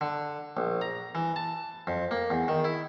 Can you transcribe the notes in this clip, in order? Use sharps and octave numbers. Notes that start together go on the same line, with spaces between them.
D3
A#1
A#5
E3
A5
F2
A#3
E2
D#3
E4